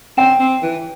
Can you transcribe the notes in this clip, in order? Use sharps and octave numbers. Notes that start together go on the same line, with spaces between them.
C4 G5
C4
E3